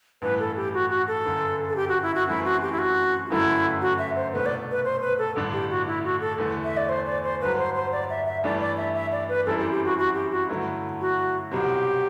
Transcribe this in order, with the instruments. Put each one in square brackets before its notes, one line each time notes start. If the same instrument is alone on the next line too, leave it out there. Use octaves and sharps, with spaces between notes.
[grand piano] A1 G2 E3 [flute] B4
[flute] A4
G4
F#4
F#4
A4
[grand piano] G1 F#2 D3
[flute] A4
G4
F#4
E4
F#4
[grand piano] F#2 E3 A3 C4 [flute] E4
[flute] F#4
G4
E4
F#4
F#4
[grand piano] G1 F#2 D3 F#3 A3 [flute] E4
[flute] F#4
E5
C5
[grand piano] C2 B2 A3 [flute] B4
[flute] D5
B4
C5
B4
A4
[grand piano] A1 G2 D3 A3 D4
[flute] G4
F#4
E4
F#4
A4
[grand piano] E2 D3 A3
[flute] E5
D5
C5
D5
C5
[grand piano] G1 G2 F#3 [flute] B4
[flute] C5
C5
D5
E5
E5
[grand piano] G2 E3 A3 D4 [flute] D5
[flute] D5
E5
E5
D5
B4
[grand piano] F#2 E3 G3 C4 E4 [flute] A4
[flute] G4
G4
F#4
F#4
G4
F#4
[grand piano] G2 D3 F#3 A3 E4
[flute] F#4
[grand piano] C2 B2 F#3 C4 [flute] G4